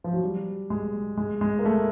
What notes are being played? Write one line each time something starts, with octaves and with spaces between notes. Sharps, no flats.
F3
F#3
G3
G#3
G#3
G#3
A#3
A3